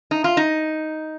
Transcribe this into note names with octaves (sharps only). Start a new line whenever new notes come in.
D#4
F4
D#4